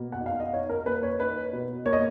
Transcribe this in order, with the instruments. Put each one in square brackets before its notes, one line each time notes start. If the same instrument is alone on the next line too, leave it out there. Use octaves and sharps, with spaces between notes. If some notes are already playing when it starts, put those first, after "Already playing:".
Already playing: [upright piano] B2 A#3
F#5
D#4
F5
D#5
D#4 C#5
A#4
A#3 B4
C#5
D#4 B4
B2
A#3 C#5
D#5